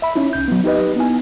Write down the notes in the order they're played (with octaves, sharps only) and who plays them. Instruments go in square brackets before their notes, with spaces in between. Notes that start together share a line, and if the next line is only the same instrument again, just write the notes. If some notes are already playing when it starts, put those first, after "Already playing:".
[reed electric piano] E5 B5
C#4 D#4 E4
C2 G6
F#3 B3
D#4 G4 B4 D#5
B3 D#4 E4 G#5